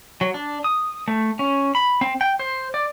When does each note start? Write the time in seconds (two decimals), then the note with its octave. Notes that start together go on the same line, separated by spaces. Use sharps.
0.21 F#3
0.34 D4
0.64 D#6
1.08 A3
1.39 C#4
1.75 B5
2.01 C4
2.21 G5
2.39 C5
2.74 D5